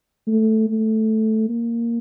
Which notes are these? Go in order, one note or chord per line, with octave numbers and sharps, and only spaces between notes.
A3
A3
A#3